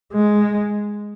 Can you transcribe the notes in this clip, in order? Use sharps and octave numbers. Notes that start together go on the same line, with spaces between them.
G#3